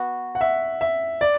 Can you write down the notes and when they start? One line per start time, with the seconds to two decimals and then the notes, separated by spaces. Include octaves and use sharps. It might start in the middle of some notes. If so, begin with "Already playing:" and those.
Already playing: B3 F#4
0.35 F#5
0.41 E5
0.81 E5
1.21 D5